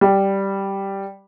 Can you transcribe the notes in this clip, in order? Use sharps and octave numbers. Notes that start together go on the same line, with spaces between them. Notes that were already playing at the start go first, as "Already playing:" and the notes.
G3